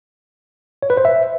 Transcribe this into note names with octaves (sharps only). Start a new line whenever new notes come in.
C#5
B4
C5
E5